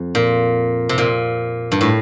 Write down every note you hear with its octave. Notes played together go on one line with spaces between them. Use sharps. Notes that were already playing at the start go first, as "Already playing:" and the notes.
Already playing: F2
A#2
C3
A#2
G2
A2